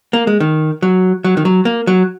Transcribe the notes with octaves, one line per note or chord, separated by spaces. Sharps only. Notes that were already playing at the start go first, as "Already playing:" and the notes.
A#3
G#3
D#3
F#3
F#3
D#3
F#3
A#3
F#3